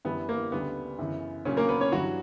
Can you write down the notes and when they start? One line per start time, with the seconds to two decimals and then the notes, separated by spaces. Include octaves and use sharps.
0.05 F#2 E3 G3 B3
0.29 A#3
0.52 D2 C#3 G3 B3
0.98 F#2 C#3 E3
1.45 A#2 C#3 F#3 C#4
1.57 A#3 A#4
1.69 B3 B4
1.80 C#4 C#5
1.92 G2 E3 F#3 G3 F#4